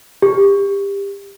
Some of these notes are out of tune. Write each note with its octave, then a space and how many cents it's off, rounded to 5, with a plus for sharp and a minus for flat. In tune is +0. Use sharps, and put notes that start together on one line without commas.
G4 +25